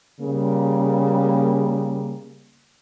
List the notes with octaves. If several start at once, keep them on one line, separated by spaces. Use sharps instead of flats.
C#3 G3 A#3